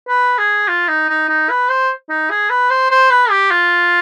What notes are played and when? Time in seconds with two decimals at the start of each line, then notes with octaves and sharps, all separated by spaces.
0.08 B4
0.38 G#4
0.68 F4
0.88 D#4
1.09 D#4
1.29 D#4
1.50 B4
1.69 C5
2.09 D#4
2.30 G#4
2.50 B4
2.70 C5
2.91 C5
3.10 B4
3.30 G4
3.51 F4